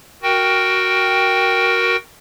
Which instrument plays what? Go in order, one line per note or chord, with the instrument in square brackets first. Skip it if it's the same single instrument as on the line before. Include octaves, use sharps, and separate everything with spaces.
[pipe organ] F#4 A#4 G5